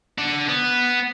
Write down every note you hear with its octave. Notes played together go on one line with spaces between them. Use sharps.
D4 F#5
B3